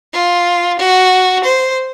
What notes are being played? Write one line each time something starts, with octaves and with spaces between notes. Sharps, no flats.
F4
F#4
C5